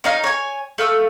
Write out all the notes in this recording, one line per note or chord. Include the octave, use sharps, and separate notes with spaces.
C#4 D#4 F5
C#5 G#5
A3 F5 E6